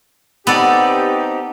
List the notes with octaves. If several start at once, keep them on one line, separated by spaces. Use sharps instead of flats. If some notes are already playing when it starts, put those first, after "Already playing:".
B3 C4 D#4 G4 A4 D5